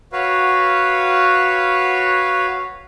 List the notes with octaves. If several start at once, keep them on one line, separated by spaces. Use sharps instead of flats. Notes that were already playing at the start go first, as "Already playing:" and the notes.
F#4 B4 C#5 F5